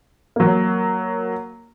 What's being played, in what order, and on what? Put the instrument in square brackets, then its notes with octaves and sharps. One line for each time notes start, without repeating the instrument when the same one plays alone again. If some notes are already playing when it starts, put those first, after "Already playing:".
[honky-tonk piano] F#3 A#3